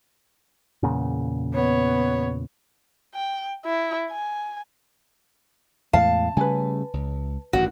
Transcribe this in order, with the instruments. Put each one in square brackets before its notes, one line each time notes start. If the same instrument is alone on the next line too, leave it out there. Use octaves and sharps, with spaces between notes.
[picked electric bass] E2 A#2 C#3
[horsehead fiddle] B3 C#5
[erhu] G5
E4
G#5
[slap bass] E2 A2 G#3 [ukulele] F5 [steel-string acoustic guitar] A5
[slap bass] C#3 G3 A3 [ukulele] B4 G#5
[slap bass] C#2
[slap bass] A1 G2 D#3 [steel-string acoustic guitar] F#4